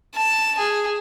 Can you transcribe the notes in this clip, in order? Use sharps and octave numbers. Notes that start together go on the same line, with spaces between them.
A5
G#4